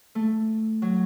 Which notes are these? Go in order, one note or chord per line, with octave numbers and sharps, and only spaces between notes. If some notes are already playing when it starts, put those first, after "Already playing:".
A3
F#3